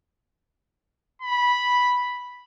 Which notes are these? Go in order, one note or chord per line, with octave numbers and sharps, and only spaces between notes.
B5